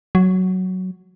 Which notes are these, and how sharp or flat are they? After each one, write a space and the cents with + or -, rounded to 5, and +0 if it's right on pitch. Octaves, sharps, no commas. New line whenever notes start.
F#3 +5